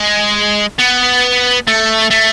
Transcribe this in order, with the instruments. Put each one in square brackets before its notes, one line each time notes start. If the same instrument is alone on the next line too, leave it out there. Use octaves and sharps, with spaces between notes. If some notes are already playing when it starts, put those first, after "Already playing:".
Already playing: [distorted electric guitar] G#3
B3
A3
A3